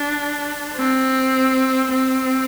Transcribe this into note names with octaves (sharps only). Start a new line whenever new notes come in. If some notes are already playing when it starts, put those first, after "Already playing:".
Already playing: D4
C4
C4